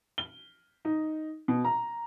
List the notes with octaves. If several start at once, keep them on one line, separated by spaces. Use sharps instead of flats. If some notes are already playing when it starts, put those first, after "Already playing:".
G7
D#4
B2
A#5